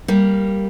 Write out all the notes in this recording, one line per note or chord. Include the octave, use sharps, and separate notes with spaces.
G3 A#3